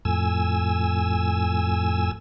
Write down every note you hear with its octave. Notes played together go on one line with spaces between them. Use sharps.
F2 A2 G#5 E6